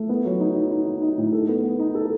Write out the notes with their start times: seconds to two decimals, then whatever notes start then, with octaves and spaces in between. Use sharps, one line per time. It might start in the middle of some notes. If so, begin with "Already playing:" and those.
Already playing: A3
0.09 B3
0.25 F#3
0.40 D#4
0.56 D#4
0.71 D#4
0.87 D#4
1.02 D#4
1.18 A2
1.33 A4
1.48 B3
1.63 B3
1.79 D#4
1.95 A4